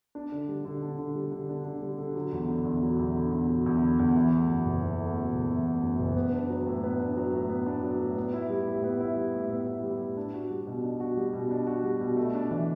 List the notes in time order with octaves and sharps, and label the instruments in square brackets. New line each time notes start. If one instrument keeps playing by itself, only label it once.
[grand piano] D4
D3
G3
D3
D4
D3
G3
D3
D4
D3
G3
D3
F#3
E2
D3
E2
F#3
E2
D3
E2
F#3
E2
D3
E2
E3
A3
F#2
F#1
E3
A3
F#2
F#1
E3
A3
F#2
F#1
B3
D4
F#3
A2
B3
D4
F#3
A2
B3
D4
F#3
A2
B3
E4
G3
A2
B3
E4
G3
A2
B3
E4
G3
A2
D4
F#4
G3
B2
D4
F#4
G3
B2
D4
F#4
G3
B2
A3
D4
E3